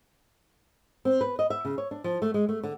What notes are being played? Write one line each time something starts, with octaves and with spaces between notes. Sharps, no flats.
C4
B4
D#5
E5
C#3
C#5
D4
F3
A3
G#3
A3
D3